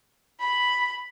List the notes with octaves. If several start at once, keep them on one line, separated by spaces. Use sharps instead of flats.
B5